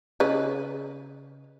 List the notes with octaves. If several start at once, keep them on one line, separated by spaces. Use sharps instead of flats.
C#3 B4 D#5